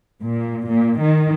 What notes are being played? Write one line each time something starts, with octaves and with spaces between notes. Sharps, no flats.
A#2
A#2
D#3